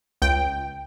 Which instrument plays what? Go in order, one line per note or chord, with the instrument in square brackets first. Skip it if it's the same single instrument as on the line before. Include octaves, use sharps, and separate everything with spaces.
[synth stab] C#2 G5